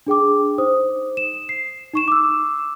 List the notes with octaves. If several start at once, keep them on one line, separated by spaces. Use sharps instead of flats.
D4 G#4 G5 D6
D#4 C5 D#6
E7
C7
D#4 C#6 E7
D6 E6